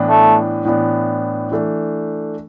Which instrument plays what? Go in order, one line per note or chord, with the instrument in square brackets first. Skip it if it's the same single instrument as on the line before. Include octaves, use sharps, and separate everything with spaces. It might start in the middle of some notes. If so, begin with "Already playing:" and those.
Already playing: [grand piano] A2 E3 B3 D4
[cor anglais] A3
[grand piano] A2 E3 B3 D4
E3 A3 D4